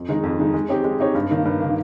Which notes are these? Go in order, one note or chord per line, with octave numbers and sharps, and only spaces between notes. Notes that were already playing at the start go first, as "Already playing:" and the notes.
Already playing: F2
D#3 G#3 D#4
F2
D#3 G#3 D#4
G#3
C4 D#4 G4 C#5
G#3
C4 D#4 G4 C#5
G2
D#3 A#3
G2
D#3 A#3